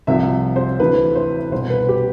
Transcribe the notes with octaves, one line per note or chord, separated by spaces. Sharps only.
C2 C3 F3 E5
C5
D2 C3 E3 B4
C5
C2 B2 C5
B4
G4